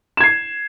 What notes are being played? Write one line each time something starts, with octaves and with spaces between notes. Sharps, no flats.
G#6 C7 E7